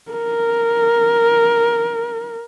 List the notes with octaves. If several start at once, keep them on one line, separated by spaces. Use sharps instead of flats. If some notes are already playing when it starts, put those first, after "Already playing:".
A#4